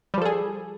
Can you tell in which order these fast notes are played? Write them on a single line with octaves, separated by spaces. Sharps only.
G3 F3 A4 G#4